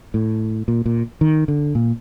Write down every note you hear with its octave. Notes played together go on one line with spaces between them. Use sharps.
A2
A#2
A#2
D#3
D3
A#2